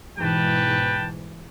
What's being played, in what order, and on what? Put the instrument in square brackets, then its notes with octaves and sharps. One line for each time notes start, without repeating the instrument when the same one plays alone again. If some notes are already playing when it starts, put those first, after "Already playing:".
[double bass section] G#2 B2 E3 [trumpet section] B4 G5 A5